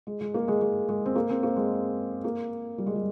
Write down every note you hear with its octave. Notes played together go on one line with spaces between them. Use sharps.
G#3
G#3
A#3
G#3
G#3
G#3
C4
A#3
C4
A#3
G#3
A#3
G3
G#3
G3